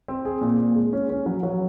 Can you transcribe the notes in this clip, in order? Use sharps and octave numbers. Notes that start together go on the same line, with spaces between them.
C4
G#4
A#2
A#2
G#3
C#4
C#4
F#3
F#3